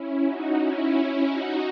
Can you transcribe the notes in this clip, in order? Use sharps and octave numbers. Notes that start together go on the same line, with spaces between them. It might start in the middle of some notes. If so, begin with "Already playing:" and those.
Already playing: C#4 E4
D#4 F#4
C#4 E4
D#4 F#4